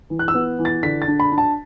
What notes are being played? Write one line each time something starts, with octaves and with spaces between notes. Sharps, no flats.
E3
F#6
E6
B3
E3
A6
D3 B6
A6
D4
B5
D4
A5